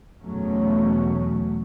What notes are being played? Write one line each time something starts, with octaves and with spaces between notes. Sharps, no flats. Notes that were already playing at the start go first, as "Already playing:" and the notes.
E2 B2 F#3 A3 C#4